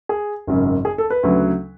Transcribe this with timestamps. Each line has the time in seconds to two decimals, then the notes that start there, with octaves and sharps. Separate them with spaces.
0.09 G#4
0.47 G#1 F#2 C#3
0.85 G#4
0.98 A4
1.10 B4
1.23 D2 C#3 F#3